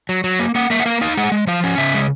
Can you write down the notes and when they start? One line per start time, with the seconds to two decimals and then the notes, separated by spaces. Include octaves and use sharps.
0.09 F#3
0.24 F#3
0.39 A#3
0.55 A#3 F#5
0.70 A#3 E5
0.80 F#5
0.86 A#3 F5
1.01 D#4 F5
1.17 G#3 F#5
1.32 G#3
1.47 F3 F5
1.64 C#4
1.78 C#3 E5
1.94 G#3